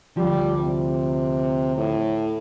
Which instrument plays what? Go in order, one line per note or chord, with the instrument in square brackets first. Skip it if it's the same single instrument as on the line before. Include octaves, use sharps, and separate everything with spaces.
[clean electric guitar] D2 F3 [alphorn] G3
[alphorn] C3
A2